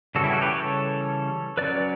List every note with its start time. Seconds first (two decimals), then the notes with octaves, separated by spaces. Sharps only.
0.15 C#3 E3 G3 C#4 F#4 A4
0.24 E4 G4
0.33 F#4 A4
0.42 G4 B4
0.51 A4 C#5
1.57 F#3 C#4 B4 D5